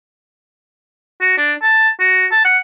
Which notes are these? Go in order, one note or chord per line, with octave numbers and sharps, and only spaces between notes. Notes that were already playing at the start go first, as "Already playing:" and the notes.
F#4
D4
A5
F#4
A5
F#5